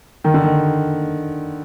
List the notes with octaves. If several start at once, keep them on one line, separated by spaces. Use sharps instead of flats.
D#3
D3
D#3